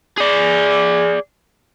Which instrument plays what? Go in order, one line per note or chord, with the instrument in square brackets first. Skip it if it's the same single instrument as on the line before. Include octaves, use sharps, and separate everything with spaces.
[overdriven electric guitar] G#4 D5